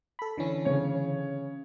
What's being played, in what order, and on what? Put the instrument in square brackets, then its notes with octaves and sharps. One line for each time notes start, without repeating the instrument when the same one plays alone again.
[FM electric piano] A4 B5
D3 E3 C#4
[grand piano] C#3 C#5